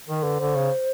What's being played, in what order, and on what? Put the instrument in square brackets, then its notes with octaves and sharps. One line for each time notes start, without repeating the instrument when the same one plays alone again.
[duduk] D#3 [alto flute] A#4
[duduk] D3 [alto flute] B4
[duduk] D3 [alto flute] C5
[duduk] C#3